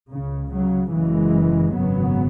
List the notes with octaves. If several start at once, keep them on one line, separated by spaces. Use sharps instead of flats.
C#2 C#3
C#3 F#3
F#1 F#2 C#3 E3 G#3
G#1 F#2 C#3 F#3 B3